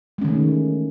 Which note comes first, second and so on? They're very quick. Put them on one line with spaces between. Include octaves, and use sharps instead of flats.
G#3 C#4 D#3 A3 E3